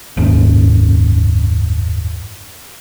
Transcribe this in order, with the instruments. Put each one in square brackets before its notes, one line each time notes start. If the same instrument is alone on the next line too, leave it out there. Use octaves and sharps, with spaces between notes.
[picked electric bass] F#1 D#2 G#2 C#4